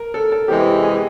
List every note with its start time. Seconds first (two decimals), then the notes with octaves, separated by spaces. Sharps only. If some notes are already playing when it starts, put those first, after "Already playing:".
Already playing: A#4
0.14 A4
0.32 A4
0.48 E2 C3 E3 G#3 G4
0.83 G#4